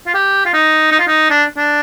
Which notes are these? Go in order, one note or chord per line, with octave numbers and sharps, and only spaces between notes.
F4
G4
F4
D#4
D#4
F4
D#4
D4
D4